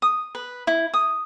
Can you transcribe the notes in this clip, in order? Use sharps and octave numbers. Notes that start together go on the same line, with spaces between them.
D#6
B4
E4
D#6